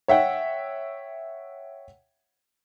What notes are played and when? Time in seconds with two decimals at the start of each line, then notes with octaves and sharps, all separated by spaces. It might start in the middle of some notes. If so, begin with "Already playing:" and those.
0.08 C#5 E5 F#5 G5